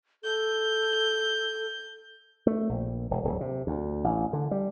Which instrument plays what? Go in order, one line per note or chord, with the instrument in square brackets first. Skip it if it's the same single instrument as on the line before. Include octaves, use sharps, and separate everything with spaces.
[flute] A4 [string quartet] G6
[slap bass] A3
A#1
E1
D1
C3
D2
A1
D3
G3